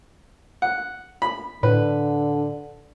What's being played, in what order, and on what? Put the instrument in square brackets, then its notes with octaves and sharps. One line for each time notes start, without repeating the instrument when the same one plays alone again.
[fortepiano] F#5
B5
[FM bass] A2 [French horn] D3 [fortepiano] B4